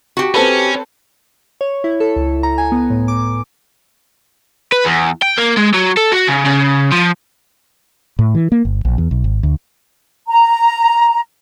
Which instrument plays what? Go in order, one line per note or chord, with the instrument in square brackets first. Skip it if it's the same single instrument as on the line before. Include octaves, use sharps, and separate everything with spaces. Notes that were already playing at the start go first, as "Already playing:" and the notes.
[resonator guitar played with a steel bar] F#4 G4
[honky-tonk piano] C4 A4 B4 [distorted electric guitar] C#4
[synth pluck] C#5
E4
A4
C#2
A#5
G#5
B3
A2
D6
[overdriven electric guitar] B4
E2
G5
A#3
G#3
F#3
A4
F#4
C#3
C#3
F3
[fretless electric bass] A2
E3
A#3
G1
A#1
E2
B1
G#1
D2
[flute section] A#5